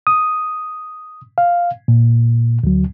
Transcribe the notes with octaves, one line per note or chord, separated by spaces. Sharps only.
D#6
F5
A#2
D2 F#3